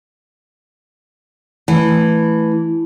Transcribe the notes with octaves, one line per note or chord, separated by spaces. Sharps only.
E3 A3